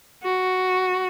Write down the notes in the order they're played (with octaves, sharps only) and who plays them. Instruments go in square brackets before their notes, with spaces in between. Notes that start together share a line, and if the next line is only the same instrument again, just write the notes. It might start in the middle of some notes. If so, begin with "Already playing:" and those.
[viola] F#4